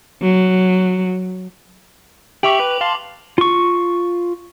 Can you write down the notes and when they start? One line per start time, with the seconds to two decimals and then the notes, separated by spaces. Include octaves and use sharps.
0.22 F#3
2.43 G4 E5 G5 C#6 D6 F7 F#7
2.60 B4
2.81 F5 A5 C6
3.38 F4 C#6